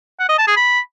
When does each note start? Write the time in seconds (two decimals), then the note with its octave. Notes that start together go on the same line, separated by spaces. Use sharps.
0.19 F#5
0.29 D#5
0.38 A5
0.47 G#4
0.57 B5